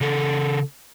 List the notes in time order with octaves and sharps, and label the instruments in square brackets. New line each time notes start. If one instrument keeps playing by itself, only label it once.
[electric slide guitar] C#3 A4